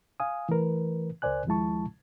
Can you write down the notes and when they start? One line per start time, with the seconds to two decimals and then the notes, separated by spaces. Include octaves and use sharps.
0.20 F5 G#5 D#6
0.49 E3 A3 A#4 B4
1.22 C#2 A#4 C5 D5 G#5 F#6
1.47 D#2 F3 G#3 E4 A5 C#6